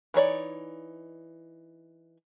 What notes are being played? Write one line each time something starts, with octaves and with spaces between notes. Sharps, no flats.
E3 D#4 C#5 D5